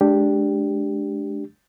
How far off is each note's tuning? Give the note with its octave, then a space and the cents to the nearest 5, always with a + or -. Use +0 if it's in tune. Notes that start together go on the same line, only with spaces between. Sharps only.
G#3 +30 D4 +0 G4 +0